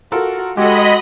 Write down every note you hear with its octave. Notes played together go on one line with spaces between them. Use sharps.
F4 F#4 A4 A#4
G#3 F#4 G4 A4 D#5 B5